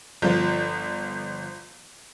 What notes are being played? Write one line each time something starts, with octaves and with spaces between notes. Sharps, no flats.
G1 F3